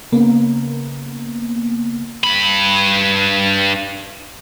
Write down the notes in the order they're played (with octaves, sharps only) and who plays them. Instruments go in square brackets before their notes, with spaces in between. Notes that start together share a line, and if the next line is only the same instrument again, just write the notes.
[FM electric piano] C#3 A#3 B3
[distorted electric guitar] G2 B5